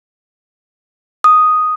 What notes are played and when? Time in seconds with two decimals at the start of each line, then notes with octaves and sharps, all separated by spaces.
1.24 D#6